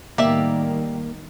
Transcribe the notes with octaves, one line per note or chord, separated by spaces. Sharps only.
A2 D#3 G3 A#3 G4 D5 E5